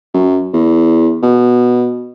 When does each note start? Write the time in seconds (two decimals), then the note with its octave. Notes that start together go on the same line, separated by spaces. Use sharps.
0.14 F#2
0.53 E2
1.23 B2